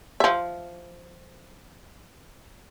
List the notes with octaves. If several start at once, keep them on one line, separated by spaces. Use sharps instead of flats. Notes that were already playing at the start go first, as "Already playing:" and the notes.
F3 E5